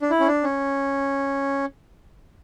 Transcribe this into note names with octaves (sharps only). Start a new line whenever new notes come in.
D4
E4
C#4
D4
C#4